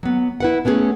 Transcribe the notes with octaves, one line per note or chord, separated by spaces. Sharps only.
F#3 B3
E4 B4 F#5
A3 B3 C#4 G4 G#4